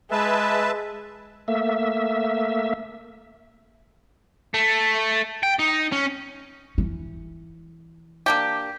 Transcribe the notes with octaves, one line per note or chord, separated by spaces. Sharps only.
G#3 B4 E5 A5
A3 A#3 E5
A3
G5
D#4
C#4
E3
A#3 D4 G4